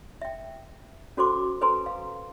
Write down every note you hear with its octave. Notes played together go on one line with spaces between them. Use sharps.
E5 G5
C#4 F#4 A4 C5 C6 D6
A4 B4 C5 G#5 A#5 C6
F5